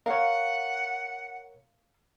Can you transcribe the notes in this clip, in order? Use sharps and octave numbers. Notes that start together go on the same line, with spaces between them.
A#4 C#5 F5 F#5